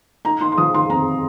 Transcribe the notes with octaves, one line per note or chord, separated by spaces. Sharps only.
D#4 A#5
D#4 C6
C6
F3 D#6
D#4 C6
F2 A#5